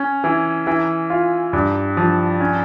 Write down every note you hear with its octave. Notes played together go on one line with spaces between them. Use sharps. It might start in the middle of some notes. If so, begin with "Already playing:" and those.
Already playing: C#4
E3
E3
F4
G2
F3
C#4